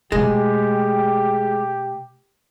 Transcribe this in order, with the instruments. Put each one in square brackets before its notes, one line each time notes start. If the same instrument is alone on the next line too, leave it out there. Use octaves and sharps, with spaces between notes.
[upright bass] B2 A3 [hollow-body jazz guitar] G#3 [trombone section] G4